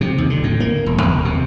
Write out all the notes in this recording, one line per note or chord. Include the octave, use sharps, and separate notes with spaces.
C3
D#2
D3
A2
A#3
E1
D#2
C3